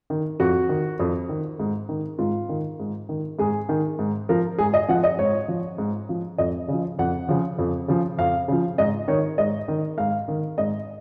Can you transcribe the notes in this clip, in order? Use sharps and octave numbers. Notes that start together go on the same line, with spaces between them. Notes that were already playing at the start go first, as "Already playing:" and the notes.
D#3
F2 F#4
D#3
F2
D#3
G#2
D#3
G#2 F4
D#3
G#2
D#3
G#2 G#4
D#3
G#2
F3 A#4
G#2 G#4
D#5
F3 F#5
D#5
G#2 C#5
F3
G#2
F3
F2 D#5
C#3 F3
F2 F#5
C#3 F3
F2
C#3 F3
F2 F5
C#3 F3
G#2 D#5
D#3 C#5
G#2 D#5
D#3
G#2 F5
D#3
G#2 D#5